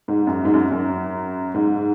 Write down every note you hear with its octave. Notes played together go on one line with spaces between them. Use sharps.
G#2
F#2
G#2
F#2
F#2
G#2